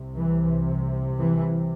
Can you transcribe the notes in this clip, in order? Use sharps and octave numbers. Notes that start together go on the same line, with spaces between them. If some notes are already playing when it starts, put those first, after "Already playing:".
Already playing: C2 C3
E3
E3